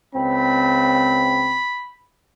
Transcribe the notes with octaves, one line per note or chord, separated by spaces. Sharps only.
C#2 C4 B5